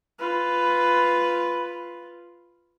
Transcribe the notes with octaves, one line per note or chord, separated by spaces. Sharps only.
F4 B4